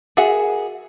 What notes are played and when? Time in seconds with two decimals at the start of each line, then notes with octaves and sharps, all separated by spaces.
0.17 F#4 G#4 A#4 E5 F#5